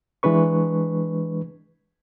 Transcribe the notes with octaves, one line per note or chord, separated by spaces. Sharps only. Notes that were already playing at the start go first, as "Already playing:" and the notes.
E3 G#3 D4 B4 C#6